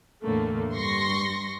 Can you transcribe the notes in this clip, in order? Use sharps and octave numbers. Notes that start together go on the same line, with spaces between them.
E2 A2 D3 A3 A#3
G2 C6 C#6 A#6